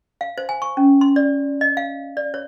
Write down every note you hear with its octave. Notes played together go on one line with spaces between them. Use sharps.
F5
C5
G#5
C#6
C#4
C6
D5
D#5
F5
D5
C#5